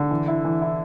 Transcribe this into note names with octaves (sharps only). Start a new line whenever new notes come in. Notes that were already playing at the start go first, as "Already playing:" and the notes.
Already playing: D3
E3
E4
E3
E4